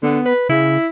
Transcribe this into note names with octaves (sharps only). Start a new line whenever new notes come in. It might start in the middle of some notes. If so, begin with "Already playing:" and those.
D3 B3
B4
C#3 E4